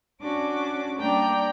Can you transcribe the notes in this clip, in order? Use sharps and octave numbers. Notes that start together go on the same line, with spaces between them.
C#4 D4 F#4 D6
G3 A#3 D4 D5 G5 A#5